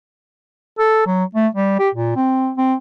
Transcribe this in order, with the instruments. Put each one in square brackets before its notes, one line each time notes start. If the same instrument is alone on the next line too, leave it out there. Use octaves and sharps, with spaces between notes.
[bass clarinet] A4
F#3
A3
G3
G4
A#2
C4
C4